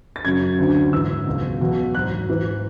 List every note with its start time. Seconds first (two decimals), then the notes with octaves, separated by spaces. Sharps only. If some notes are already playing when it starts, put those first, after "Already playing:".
0.16 A6
0.25 F#2 C#3 F#3 G#6
0.58 D2 D3 F#3
0.93 G#2 E3 E6
1.26 C#2 B2 F#3
1.60 E2 B2 F#3
1.94 G#2 F#3 F#6
2.29 G#2 E3